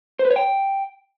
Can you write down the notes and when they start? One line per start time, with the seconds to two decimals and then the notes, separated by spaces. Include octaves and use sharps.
0.19 C5
0.25 B4
0.31 C#5
0.36 G5